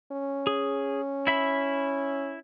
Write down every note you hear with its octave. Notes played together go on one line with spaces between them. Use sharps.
C#4
G#4
E4 E5 B5